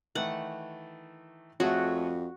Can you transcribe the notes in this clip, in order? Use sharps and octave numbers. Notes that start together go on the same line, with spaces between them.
D#3 E3 A3 F#5
F2 A3 F#4 G#4 C#5